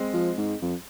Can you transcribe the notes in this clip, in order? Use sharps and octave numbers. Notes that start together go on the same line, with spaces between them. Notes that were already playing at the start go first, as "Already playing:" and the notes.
Already playing: G#3 C4
F3
G#2
F2